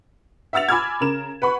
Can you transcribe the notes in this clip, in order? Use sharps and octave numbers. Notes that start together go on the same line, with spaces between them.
E5 F#5 E6 A6 F7
G#5 B5 D6 E6 F6 G#6
C#3 A#4 E7
B4 F#5 B5 C#6